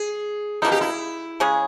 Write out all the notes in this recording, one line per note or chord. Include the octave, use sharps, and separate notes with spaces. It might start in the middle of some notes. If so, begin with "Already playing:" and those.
Already playing: G#4
B2 A#3 D#4 E4
G4
E4
C#3 G#3 C#4 G#4